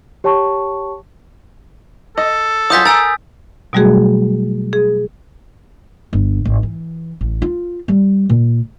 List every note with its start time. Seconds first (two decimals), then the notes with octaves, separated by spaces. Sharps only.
0.24 G4 C#5 G5 A5 C#6
2.18 A4 D#5
2.70 F#3 F4 G#5 D#6 G6 B6
2.85 A#4 G#5 E6 A6
3.73 B2 F#3 G3 A3 F#4 G#4
4.73 G#4
6.13 G1
6.45 G#1
6.63 E3
7.21 A1
7.42 F4
7.88 G3
8.29 A#2